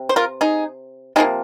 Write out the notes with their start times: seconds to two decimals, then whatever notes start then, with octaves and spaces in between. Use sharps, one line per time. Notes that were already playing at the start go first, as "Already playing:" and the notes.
Already playing: C3
0.09 C5
0.16 F4 A#4
0.41 D#4 G#4
1.16 C3 F3 A#3 D#4 G#4